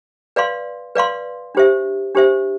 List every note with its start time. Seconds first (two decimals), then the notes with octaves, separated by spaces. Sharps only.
0.36 B4 D5 F5 C6
0.95 B4 D5 F5 C6
1.55 D4 G4 C5 E5
2.15 D4 G4 C5 E5